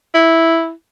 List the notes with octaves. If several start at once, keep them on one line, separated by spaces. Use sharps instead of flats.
E4